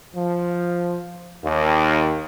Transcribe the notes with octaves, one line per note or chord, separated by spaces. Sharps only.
F3
D#2